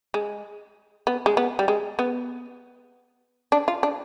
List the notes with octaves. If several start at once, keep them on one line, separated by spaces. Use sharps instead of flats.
G#3
B3
G#3
B3
G3
G#3
B3
D4
F4
D4